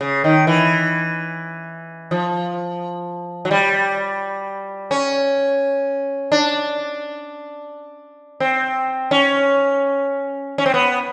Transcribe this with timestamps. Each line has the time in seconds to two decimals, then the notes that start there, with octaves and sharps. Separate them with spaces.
0.01 C#3
0.24 D#3
0.47 E3
2.11 F3
3.45 F#3
3.51 G3
4.91 C#4
6.32 D4
8.40 C4
9.11 C#4
10.58 C#4
10.66 C4
10.74 B3